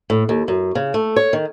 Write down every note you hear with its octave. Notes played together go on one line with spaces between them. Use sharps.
A2
D#2
F#2
C#3
A3
C#5
D#3